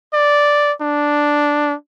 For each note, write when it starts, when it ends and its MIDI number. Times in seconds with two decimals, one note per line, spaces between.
0.13 0.72 74
0.82 1.74 62